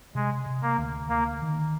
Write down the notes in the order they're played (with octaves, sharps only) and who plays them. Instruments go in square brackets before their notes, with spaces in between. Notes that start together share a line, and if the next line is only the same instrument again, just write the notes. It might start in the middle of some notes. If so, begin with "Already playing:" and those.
[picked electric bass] C3 [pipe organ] G#3
[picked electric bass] C3
[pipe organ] A#3
[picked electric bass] D2
[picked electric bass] D2 [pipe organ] A#3
[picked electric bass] D#3